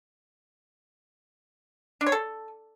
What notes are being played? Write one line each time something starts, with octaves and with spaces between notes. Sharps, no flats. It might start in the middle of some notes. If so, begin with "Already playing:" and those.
D4
C#5
A4